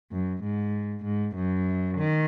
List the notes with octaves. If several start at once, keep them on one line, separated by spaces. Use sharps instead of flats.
F#2
G#2
G#2
F#2
D#3